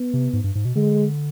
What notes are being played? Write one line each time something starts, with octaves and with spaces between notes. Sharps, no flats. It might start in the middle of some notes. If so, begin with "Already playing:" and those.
Already playing: B3
C3
G#2
G2
G#2
B2
D3 G#3